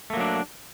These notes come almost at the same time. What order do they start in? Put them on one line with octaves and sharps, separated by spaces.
A3 A#3 F#3 D4